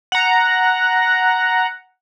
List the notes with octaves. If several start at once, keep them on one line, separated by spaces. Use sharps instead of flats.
F#5 A#5